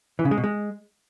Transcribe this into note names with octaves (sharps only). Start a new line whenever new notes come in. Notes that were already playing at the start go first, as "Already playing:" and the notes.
E3
C#3
G#3
B2
G#3